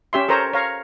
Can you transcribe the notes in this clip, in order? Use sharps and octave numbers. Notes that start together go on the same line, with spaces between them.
C#4 G4 E5 C6
A4 A#4 C5 C#5 A#5
C#5 F5 A#5